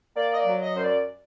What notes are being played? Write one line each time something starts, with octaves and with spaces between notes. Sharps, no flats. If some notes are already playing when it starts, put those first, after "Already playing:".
A#3 D5
D#5
D5
F#3
D#5
F#2 C5
D5